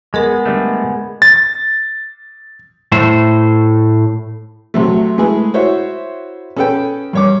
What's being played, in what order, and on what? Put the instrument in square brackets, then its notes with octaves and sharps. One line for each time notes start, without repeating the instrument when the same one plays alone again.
[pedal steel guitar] G#3 B3 [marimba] G#4 A#4 D#5
[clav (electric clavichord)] D3 G3 A3
[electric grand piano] A6
[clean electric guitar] A2 A3 C5
[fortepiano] C3 F#3 A3
G#3 A3 E4 G#4 B4
E4 F#4 C5 C#5 E5
C#4 G#4 A4 B4 G5
G2 C#5 D6